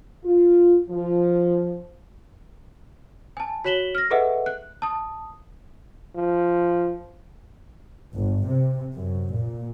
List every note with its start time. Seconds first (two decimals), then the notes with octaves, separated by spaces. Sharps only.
0.25 F4
0.90 F3
3.37 G#5 A5
3.64 F#4 C#5 B6 E7 F#7 G7
3.95 F6 A#6
4.10 G#4 A4 B4 D#5 E5 F#5
4.46 F#6
4.82 A5 D#6
6.15 F3
8.15 G1
8.48 C3
8.96 F#2
9.35 A#2